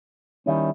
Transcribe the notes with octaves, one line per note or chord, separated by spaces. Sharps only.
D#2 D#3 G3 C#4 E4